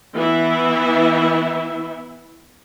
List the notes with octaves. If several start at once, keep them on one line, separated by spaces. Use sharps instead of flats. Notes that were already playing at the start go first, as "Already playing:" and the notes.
E3 B3 E4 E5